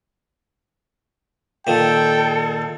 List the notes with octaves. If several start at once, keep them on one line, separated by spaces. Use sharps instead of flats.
A#2 D#3 A4 G5